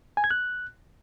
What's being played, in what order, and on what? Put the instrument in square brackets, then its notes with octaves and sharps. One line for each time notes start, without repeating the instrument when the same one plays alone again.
[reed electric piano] G#5
G#6
F#6